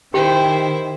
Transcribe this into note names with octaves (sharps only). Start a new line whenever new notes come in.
D#3 E4 G4 C5 G5